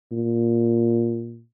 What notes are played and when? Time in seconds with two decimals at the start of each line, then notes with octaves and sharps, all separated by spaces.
0.12 A#2